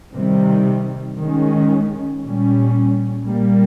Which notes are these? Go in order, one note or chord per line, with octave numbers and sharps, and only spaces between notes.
C3 D#3 G3
D#3 G#3 C#4
A#2 G3 C#4
A#2 G3 A#3